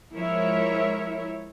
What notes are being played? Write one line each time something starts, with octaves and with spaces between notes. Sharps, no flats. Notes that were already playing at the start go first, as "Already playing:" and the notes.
F3 G#3 E4 A#4 C#5 E5